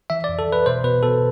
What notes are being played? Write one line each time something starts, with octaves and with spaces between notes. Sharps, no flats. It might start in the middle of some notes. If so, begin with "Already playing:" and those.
E3 E5
D5
F2
A4
E3 B4
B2 C5
B2 B4
B2 A4